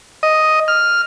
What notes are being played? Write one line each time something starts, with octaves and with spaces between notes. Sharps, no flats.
D#5
F6